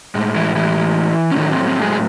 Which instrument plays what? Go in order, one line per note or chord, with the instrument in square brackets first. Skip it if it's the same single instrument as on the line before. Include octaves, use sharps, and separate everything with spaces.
[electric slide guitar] A2 G#3
E3 E4
E3 E4
C#4
A2 D#3 F#3 A3 D#4
C4
C4
G#3 G#4
G#4